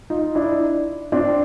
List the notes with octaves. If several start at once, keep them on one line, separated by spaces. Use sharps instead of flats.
D#4 F4
D4 E4
C4 D4